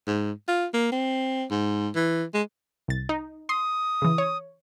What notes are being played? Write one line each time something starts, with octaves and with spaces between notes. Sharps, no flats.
G#2
F4
A#3
C4
G#2
E3
G#3
C2 A6
D#4
C6 D#6
C#3 E3
C#5